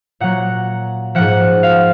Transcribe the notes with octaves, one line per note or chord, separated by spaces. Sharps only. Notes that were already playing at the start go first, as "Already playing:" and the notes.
A#2 F#3 F#5
G#2 F3 F#5
F5